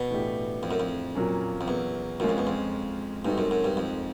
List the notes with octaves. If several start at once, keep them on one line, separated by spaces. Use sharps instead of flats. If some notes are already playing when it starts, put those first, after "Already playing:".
Already playing: B2
A2 E3 A3 D4 G4
F2
F#2
F2
A#2 F#3 A#3 C#4
F2
E2
F#2 G#3 C#4 F4
F2
E2
F2
G2 G#3 C4 D#4 F#4 A4
F#2
F#2
G2
F2